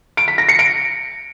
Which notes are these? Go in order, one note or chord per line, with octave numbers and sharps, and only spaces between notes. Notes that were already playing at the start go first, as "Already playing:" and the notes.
D7
B6
A#6
C#7
D7